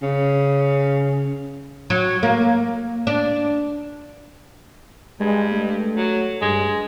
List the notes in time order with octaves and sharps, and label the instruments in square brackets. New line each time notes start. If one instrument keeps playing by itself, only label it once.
[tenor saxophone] C#3
[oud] F#3
A#3
D4
[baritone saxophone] G2 [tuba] G#3
[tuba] A3
[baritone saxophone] F#3
[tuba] G2 [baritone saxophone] G#3